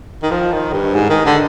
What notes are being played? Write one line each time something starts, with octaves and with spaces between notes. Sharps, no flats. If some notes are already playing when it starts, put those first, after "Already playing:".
D#3
F3
D#3
G2
G#2
D#3
D3